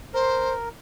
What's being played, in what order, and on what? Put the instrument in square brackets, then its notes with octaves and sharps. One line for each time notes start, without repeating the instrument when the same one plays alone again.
[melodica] A#4 [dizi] C5